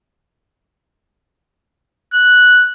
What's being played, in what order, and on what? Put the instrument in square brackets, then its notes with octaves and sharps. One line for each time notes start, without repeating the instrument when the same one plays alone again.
[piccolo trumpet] F#6